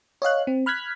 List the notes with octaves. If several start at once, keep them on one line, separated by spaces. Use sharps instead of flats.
C#5 D#5 F5 F#6
C4
B5 F6 F#6 G#6 B6